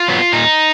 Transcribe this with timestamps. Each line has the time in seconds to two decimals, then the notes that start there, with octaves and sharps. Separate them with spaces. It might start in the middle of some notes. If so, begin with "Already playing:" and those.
Already playing: F4
0.08 F#3 B3
0.33 A#2 D#4